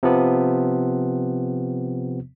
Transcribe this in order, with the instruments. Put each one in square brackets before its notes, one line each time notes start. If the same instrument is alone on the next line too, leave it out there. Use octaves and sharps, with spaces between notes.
[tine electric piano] C3 F3 B3